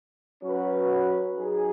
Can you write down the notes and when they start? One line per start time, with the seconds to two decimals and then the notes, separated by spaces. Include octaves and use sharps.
0.42 F#3 C#4 F#4 B4
1.37 F#3 D#4 G#4